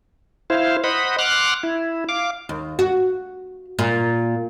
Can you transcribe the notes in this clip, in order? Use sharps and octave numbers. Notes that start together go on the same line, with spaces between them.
E4 C5 F5
C5 D#5 F#5 B5
F#5 C6 D6 F6 F#6
E4
F5 D6
D#2
F#4
A#2